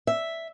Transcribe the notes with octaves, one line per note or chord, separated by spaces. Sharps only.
E5